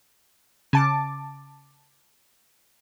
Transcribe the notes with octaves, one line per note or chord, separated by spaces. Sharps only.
C#3 A5 D6